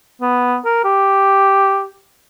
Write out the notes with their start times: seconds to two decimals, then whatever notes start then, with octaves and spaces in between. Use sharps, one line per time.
0.21 B3
0.65 A#4
0.84 G4